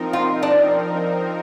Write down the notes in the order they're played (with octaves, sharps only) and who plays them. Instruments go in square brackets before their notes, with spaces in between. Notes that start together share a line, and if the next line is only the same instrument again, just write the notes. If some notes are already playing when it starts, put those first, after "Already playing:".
Already playing: [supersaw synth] F3 C4 D#4 A#4
[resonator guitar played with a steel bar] F4
D4